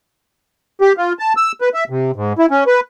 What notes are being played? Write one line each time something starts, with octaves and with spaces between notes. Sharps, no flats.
G4
F4
A5
E6
B4
E5
C3
G#2
E4
C#4
B4